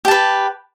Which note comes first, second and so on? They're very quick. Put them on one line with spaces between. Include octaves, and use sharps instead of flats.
G4 A5 B4